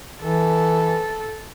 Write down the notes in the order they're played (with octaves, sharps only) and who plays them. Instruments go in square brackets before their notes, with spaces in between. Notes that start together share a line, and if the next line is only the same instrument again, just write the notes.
[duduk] E3 [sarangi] A4